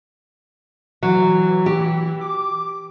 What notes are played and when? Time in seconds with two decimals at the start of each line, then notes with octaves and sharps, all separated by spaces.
1.03 E3 F#3
1.66 G4
2.21 D6